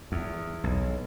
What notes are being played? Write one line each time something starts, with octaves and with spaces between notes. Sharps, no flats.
E2
B1